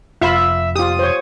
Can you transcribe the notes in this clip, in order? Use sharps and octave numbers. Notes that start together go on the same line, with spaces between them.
F1 F4 E5 F5 B5
F4 G4 D#6
C5 C#5